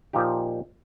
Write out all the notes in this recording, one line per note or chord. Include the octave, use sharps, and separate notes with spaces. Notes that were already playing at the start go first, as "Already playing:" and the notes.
A#2 F3 A#3 D#4 G4